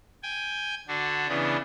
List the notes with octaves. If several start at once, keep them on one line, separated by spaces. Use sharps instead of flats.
G5 G#5
D3 D4 F#4
C#3 E3 B3 D4